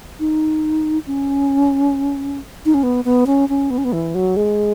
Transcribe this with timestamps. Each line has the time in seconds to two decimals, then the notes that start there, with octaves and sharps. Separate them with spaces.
0.20 D#4
1.07 C#4
2.65 D#4
2.74 C#4
2.83 B3
3.05 B3
3.27 C#4
3.49 C#4
3.70 B3
3.78 C#4
3.85 B3
3.93 E3
4.15 F#3
4.37 G#3